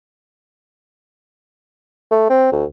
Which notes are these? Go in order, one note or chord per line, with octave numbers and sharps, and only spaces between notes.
A3
C4
D2